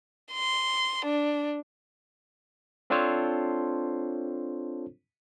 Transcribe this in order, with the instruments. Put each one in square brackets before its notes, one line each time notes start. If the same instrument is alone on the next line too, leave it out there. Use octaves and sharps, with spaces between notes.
[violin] C6
D4
[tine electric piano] C4 D4 F4 A4 C5 C#5